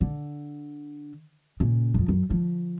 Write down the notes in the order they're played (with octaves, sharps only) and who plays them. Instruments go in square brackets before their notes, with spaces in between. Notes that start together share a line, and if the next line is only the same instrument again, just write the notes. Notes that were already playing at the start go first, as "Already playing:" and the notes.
[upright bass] D3
A#2 C#3
F2 F3
F#2
D3 F3